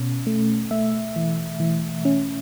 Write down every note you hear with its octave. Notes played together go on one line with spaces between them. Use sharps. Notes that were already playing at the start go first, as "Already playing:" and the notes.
Already playing: B2 C#4
A3
A3 E5
E3
E3
C#4